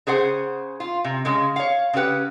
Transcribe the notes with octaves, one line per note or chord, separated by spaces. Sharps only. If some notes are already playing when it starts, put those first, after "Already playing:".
C#3 G#4 C5 F#5
F4
C3
C#3 G#3
C#5 F5
C#3 C#4 G4 B4 F#5